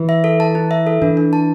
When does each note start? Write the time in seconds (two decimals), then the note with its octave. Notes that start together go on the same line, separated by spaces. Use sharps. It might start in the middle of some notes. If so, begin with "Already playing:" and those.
Already playing: E3
0.09 E5
0.24 A4
0.40 A5
0.55 E4
0.71 E5
0.87 A4
1.02 E3 D4
1.17 D4
1.33 A5